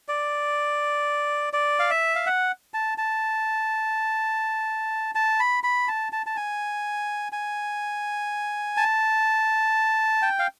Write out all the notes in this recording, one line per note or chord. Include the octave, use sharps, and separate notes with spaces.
D5
D5
F5
E5
F5
F#5
A5
A5
A5
B5
B5
A5
A5
A5
G#5
G#5
A5
G5
F5